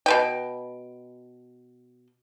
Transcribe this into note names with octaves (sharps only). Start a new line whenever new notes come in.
B2 B4 G5